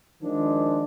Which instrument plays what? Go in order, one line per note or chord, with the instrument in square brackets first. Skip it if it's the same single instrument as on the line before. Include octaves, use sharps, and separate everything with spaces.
[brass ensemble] D#3 F3 G#3 D4